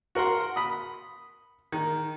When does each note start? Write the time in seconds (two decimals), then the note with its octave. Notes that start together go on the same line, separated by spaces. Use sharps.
0.15 F#4 A#4 F#5 C6
0.56 B5 D#6
1.72 D#3